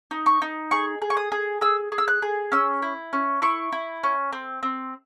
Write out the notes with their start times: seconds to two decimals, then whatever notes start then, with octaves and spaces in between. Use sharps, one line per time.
0.11 D#4
0.26 C#6
0.42 D#4
0.71 G#4 C#6
1.02 G#4
1.10 C#6
1.17 D#6
1.32 G#4
1.61 G#4 E6
1.92 G#4
1.98 E6
2.08 F#6
2.22 G#4
2.52 C#4 E6
2.82 E4
3.13 C#4
3.42 E4 C#6
3.72 E4
4.03 C#4
4.33 C4
4.63 C4